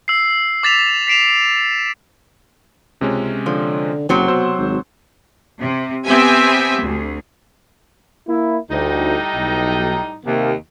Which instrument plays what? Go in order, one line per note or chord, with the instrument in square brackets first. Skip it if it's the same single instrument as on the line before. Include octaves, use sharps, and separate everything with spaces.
[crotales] E6 C7
D6 E6 A6 B6 E7 F7
B6 C7 D7 E7 F7
[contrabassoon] C#2 [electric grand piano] C3 G#3 C#4
[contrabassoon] D3 [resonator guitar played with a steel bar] F3
[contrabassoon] F#1 [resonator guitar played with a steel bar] C3 F#3 C4
[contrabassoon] B2 [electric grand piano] C5 E6
[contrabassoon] G#1
[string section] C3
B3 C4 G4 E5 G#5
D2
[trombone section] A#3 E4
[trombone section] D2 [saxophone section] A2 G3 D#4
[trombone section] B1
[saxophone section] D#2 [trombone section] C3 A#3